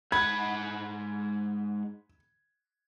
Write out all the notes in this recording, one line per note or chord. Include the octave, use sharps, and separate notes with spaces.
G#2 F#5 B5 G#6